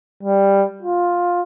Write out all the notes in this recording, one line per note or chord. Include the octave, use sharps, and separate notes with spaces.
G3
F4